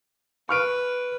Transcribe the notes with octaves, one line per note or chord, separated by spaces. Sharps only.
B4 C#6 F6 D7